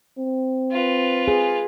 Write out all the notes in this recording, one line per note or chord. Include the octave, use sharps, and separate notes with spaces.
C4
F4 B4
G#4